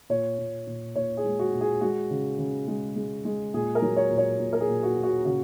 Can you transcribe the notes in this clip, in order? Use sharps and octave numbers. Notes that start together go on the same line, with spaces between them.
A#2 C#5
A#2
A#2
A#2 C#5
G#4
G#3
F#4
A#2
G#4
G#3 F#4
C#3
C#3
G#3
G#3
G#3
A#2 G#4
A#4
F#3
C#5
A#2
C#5
A#2
A#4
G#4
A#2
F#4
A#2
F#4
C#3 F#4